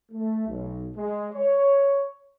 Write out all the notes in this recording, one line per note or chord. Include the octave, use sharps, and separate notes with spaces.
A3
B1
G#3
C#5